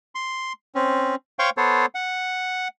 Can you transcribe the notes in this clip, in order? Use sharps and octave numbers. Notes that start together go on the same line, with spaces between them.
C6
C4 C#4
C5 C#5 F5 G5 C#6
B3 A4 C5 C#5
F#5